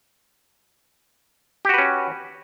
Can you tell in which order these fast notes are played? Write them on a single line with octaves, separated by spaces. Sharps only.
G4 F#4 B4 C#4